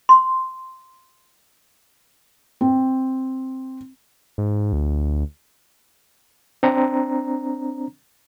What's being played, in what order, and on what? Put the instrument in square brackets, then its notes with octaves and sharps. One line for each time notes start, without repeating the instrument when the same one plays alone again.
[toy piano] C6
[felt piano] C4
[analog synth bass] G#2
D2
[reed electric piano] C4 D4 A#5